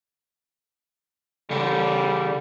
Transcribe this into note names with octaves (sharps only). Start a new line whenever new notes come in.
C#3 G3 A4